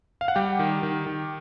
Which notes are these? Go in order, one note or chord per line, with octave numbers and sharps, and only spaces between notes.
F5
F#5
G3 G4 G5
D#3
D#3
D#3